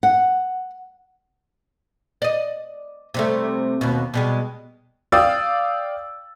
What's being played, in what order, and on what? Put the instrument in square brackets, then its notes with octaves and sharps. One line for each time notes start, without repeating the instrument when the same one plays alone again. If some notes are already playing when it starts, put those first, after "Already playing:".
[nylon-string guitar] F#5
[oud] D5 D#5
C3 G3 A3
D#2 B2
B2 G3 G#3
[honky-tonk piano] D5 F5 G5 D#6 E6 A6